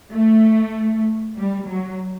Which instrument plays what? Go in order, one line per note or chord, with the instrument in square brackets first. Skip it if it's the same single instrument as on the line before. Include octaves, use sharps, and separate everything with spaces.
[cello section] A3
G3
F#3